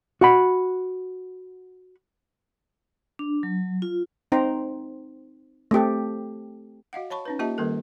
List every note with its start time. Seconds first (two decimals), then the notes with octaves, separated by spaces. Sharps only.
0.21 F#4 F#5 B5
3.19 D4
3.43 F#3
3.82 F4
4.32 C4 D#4 C5 G5 A#5
5.71 A3 C4 G4 A4
6.93 F#4 D#5 F5 F#5
7.10 C#5 A5 B5 C#6
7.25 C#4 D#4 B4
7.39 A#3 F4 G4 D#5 E5 A5
7.58 D#3 G3 A#3 A4 A#4